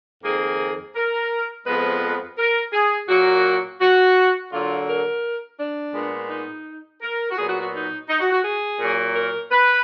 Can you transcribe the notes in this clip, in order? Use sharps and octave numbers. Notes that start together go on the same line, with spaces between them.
F2 D#3 A#3 G#4
A#4
F2 F3 G#3 B3 B4
A#4
G#4
A#2 F#3 A#3 F#4
F#4
D3 F#3 A#3 F4
A#4
D4
A#2 G#3 B3
D#4
A#4
F#4
A#2 F#3 B3 G#4
F#4
F#4
D#4
D#4
F#4
F#4
G#4
A#2 F#3 A#3
A#4
B4